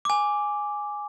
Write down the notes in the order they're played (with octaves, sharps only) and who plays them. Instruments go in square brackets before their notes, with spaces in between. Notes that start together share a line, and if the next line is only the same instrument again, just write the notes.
[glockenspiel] G#5 D6